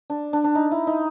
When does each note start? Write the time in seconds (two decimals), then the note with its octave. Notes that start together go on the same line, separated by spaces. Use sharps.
0.10 D4
0.33 D4
0.44 D4
0.55 D#4
0.71 E4
0.87 D#4